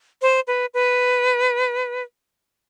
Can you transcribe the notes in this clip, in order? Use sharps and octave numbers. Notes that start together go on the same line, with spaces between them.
C5
B4
B4